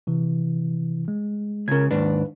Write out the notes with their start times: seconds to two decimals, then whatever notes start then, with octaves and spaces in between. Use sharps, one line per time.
0.07 C3 E3
1.08 G#3
1.68 C#2 C#3 A#4 G#6
1.91 D#2 G#2 D4 B4